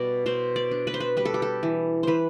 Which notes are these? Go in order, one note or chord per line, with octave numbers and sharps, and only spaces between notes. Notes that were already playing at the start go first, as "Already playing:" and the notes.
Already playing: B2 G3 D5
B2 C5
D5
D4
B4
C5
B4
G3 B4
A4
G4
A4
E3
E3 B4 C5